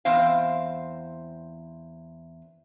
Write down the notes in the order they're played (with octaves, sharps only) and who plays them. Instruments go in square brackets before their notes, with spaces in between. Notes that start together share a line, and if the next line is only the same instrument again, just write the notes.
[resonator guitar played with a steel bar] E2 C4 C5 F5